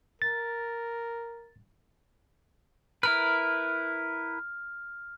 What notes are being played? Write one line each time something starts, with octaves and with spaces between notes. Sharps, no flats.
A#4 A6
E4 A#4 B4 F6